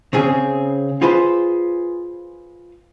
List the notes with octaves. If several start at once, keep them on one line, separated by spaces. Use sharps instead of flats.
C#3 C4 G#4
F4 G#4 B4 C5